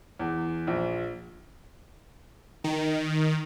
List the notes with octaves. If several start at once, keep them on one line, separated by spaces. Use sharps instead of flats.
E2
A#1
D#3